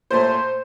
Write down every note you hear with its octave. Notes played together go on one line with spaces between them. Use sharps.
A#2 A3 C5